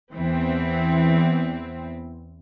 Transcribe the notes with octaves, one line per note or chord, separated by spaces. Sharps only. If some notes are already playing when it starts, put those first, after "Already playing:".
E2 E3 C4